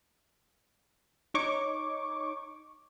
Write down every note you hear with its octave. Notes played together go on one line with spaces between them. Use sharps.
D#4 C#5 C#6 D6